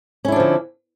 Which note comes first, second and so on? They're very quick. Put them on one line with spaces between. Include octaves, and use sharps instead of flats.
C#4 E4 D4 F3 D3